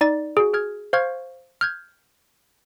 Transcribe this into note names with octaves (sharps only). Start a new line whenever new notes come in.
D#4 D5 A6
F#4 G#4
G#4 F6 G#6
C5 F5 C#6 F6 G#6
F6 G6 G#6